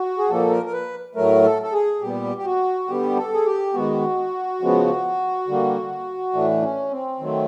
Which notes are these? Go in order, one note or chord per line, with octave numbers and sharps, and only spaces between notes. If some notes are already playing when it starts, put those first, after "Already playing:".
Already playing: F#4
G#4
A#2 F3 A#3 A4
A#4
A#4
B4
A2 F#3 A3 A#4
A4
A4
G#4
A#2 G3 B3 G4
G4
F#4
D3 G3 B3 G4
A4
G#4
G4
D#3 G#3 B3 F#4
C#3 F3 G#3 B3
D3 G3 A#3
A2 E3 A3 D4
C#4
C4
D#3 F#3 A3